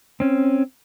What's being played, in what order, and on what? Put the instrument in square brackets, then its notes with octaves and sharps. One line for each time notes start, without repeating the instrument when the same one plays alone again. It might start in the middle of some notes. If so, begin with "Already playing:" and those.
[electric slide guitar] C4 C#4